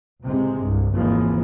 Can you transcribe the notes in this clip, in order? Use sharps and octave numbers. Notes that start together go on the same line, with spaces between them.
C#2 A2 C3 G#3
C2 G2
G#1 D#2 G#2 E3 F3 G#3